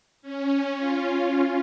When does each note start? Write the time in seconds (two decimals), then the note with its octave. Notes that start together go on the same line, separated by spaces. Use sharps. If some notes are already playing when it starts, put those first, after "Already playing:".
0.22 C#4
0.76 F4